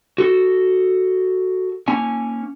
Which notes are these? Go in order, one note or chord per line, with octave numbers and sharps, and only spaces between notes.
F#4 A4
A#3 C#4 G#5